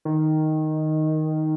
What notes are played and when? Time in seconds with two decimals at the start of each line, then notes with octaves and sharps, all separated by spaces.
0.05 D#3